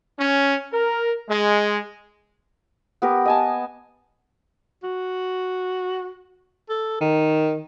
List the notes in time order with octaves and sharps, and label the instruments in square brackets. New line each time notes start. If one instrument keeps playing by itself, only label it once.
[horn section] C#4
A#4
G#3
[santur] B3 G4 A#4
D#5 G#5 A5
[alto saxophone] F#4
A4
D#3